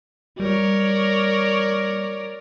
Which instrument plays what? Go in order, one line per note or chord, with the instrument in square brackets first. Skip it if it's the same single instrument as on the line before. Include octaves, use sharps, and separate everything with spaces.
[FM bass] G3 [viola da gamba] A#4 C#5 D5